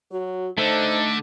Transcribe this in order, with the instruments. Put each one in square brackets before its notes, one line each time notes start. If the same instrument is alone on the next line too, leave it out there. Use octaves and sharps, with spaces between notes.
[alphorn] F#3 [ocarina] F#4
[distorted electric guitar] D3 [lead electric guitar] A3 A4 [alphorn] D#4 [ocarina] C5